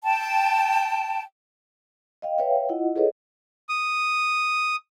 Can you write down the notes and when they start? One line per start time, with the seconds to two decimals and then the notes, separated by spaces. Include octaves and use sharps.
0.04 G5 A5
2.22 D#5 F5 G5
2.38 B4 C#5 E5 F5 G5
2.69 E4 F4 D#5 F#5
2.96 G#4 A4 B4 C#5 D#5
3.69 D#6